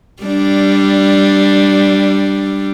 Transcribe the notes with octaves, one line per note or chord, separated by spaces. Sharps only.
G3 D4